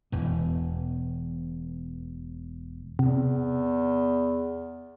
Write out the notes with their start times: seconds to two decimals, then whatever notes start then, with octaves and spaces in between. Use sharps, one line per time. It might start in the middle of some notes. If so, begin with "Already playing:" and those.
0.12 E1 E2 B2
2.99 E2 C3